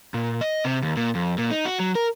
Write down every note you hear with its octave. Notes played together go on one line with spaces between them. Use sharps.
A#2
D#5
C3
D#2
A#2
F2
A#2
D#4
F#4
F#3
A#4